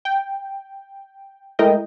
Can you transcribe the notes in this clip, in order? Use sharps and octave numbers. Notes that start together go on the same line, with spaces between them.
G5
G#3 A3 E4 A#4 D#5 G5